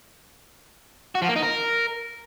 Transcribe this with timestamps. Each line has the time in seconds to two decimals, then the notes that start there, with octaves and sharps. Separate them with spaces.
1.15 F#4
1.22 F3
1.29 A#3
1.36 D#4
1.43 A#4